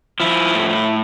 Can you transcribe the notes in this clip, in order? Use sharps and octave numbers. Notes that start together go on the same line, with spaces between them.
F3 E4
A2